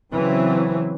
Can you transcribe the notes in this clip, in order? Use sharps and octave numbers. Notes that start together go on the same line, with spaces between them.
C#3 E3 F#3 C4